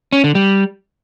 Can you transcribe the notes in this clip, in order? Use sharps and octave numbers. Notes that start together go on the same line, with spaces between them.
C#4
D3
G3